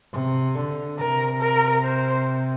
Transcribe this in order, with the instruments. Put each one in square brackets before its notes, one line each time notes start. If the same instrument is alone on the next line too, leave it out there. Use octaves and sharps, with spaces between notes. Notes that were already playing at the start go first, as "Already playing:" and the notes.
[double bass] C3
D3
[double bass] C3 [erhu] A#4
[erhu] A#4
C5